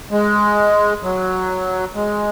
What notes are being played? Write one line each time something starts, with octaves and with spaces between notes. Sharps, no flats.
G#3
F#3
G#3